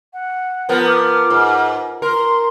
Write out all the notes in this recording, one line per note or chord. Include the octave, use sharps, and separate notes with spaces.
F#5
F3 B3 A#4
D6 F6
G#2
A#4 C6